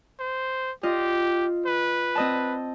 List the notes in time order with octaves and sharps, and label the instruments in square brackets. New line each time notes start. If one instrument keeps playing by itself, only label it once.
[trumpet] C5
[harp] F4 D#5 [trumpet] G4
[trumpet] B4
[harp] C4 D#5 A5